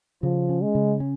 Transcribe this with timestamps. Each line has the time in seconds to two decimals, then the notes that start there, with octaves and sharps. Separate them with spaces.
0.23 C#3 F3
0.49 C#4
0.62 G#3
0.75 C#3
1.00 C#4